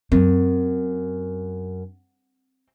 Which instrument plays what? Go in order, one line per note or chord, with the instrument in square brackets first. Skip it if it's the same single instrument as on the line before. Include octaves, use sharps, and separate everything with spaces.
[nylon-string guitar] F#2 [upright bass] C4